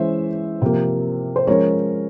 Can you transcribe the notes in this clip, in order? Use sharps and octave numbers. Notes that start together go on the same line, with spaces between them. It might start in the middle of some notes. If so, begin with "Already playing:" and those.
Already playing: E3 G#3 C#4 C5 E5
C3 F3 A#3
C5
F3 G#3 C#4 A#4 C#5